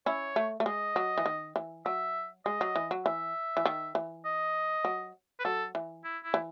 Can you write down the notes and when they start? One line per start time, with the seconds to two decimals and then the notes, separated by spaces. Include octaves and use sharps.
0.06 C#4 E4 C#5
0.36 A3
0.60 A3
0.66 G#3 D#5
0.96 F#3
1.18 E3
1.26 D#3
1.56 E3
1.85 F#3 E5
2.46 G#3 D#5
2.61 F#3
2.76 E3
2.91 F#3
3.06 E3 E5
3.57 E3
3.66 D#3
3.95 E3
4.25 D#5
4.85 F#3
5.40 B4
5.45 F#3 A4
5.75 E3
6.04 E4
6.24 E4
6.34 E3